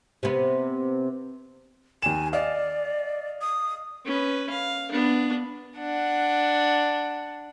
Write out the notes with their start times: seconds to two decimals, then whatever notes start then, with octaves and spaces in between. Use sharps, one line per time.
0.23 C3 B3
2.02 D#2 G#5 E7
2.33 D5 D#5 F5
3.41 D#6
4.05 C#4 B4
4.50 F5
4.92 B3 D4
5.78 D4 F#5